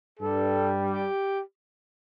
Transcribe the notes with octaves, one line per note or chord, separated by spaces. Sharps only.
G2 G3 A4
G4